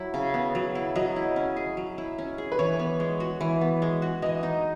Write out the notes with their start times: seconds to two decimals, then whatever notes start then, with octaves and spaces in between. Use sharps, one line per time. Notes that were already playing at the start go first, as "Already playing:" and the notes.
Already playing: F#3 E4
0.14 C#3
0.34 B3
0.55 F#3
0.75 E4
0.96 F#3 D#5
1.16 E4
1.36 C#4
1.56 G#4
1.77 F#3
1.98 E4
2.18 C#4
2.38 G#4
2.52 B4
2.59 E3 C#5
2.79 B3
3.00 G#3
3.20 F#4
3.41 E3
3.61 B3
3.82 G#3
4.02 F#4
4.22 E3 D#5
4.43 D#4